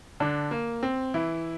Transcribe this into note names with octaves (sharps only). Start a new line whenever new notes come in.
D3 D4
A#3
C4
E3 E4